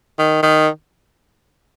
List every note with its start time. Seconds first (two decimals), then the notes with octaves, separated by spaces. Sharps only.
0.19 D#3
0.43 D#3